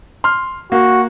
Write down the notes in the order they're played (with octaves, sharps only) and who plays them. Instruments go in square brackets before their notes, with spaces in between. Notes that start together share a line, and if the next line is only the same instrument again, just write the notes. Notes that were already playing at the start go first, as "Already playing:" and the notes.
[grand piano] C6 F6
[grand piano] A#3 [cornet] F#4